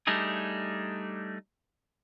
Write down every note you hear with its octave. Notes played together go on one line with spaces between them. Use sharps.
G3 A3 D4 D#4 G#4